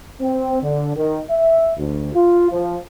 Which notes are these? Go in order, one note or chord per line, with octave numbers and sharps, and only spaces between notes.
C4
D3
D#3
E5
D2
F4
F3